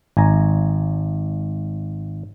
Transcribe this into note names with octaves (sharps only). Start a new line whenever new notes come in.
G#1 G#5 A#5